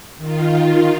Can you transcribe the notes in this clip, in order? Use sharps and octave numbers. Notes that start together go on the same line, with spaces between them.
D#3 F4